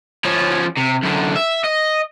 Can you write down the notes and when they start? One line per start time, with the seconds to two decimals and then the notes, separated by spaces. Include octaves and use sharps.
0.25 F3 C#4
0.78 C3
1.03 F#2 D3
1.36 E5
1.64 D#5